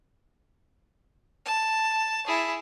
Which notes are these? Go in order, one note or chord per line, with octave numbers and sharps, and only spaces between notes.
A5
E4 G#4